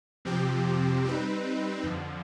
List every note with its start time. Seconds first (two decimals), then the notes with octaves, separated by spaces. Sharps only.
0.25 F2 C3 F3 C4 G4
1.04 G3 C4 D#4 B4
1.83 F2 D3 F3